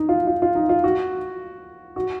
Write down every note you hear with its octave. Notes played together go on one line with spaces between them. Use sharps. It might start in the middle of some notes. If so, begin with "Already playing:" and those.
Already playing: D#4
F4
F4
F4
D#4
F4
F#4
F#4